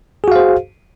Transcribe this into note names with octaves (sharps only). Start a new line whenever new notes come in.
F#4 G#4 C5 F5